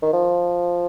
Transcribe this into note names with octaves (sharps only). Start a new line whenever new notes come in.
D#3
F3